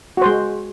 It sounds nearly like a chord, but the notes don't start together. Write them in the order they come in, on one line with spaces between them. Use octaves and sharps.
F#4 C5 G#3